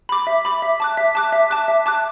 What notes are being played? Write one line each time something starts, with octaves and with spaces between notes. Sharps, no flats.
B5 D6
E5
B5 D6
E5
A5 D6 F#6
E5
A5 D6 F#6
E5
A5 D6 F#6
E5
A5 D6 F#6